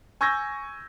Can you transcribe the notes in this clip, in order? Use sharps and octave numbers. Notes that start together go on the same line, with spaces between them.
G#5 C#6 E6 G6 G#6 A#6